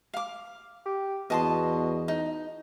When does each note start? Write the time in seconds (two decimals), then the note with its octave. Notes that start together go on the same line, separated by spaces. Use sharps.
0.14 F5 D6
0.86 G4
1.30 E2 B2 D#5 A5 C6
2.08 D#4